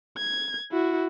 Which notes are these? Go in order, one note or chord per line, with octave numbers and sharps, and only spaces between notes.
G#6
E4 F#4